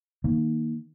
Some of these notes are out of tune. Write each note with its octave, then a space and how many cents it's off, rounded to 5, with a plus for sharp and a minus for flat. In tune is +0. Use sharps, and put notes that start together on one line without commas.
D#3 +0 A#3 +0